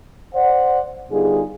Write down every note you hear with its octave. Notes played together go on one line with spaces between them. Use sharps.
C5 D5 F#5
D3 G3 B3 D#4 F4 G#4